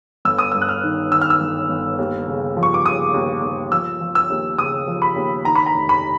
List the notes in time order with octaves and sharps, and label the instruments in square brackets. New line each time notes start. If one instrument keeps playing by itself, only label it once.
[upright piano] G1 E6
D#6
G2 E6
F#6
F6
D#3
D#3 E6
F6
E6
G1
G1
D#2
C#3
F3
C#6
D6
C#3 D#6
D#2
D#2
F3 E6
F3
E6
D#2
C#3 D#6
F3
B5
D#2
D#3 A#5
B5
A#5
F1
B5